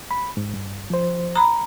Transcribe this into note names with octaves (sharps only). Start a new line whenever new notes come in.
B5
G#2
G2
F3 C5
A#5 B5